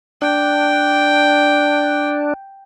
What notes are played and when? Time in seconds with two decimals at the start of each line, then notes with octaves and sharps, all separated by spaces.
0.22 D4 G5